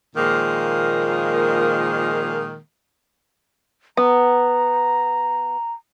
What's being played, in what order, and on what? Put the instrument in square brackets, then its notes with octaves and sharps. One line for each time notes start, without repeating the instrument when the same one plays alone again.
[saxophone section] A#2 D#3 F3 G#3 A#3
[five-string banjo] B3 [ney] A#5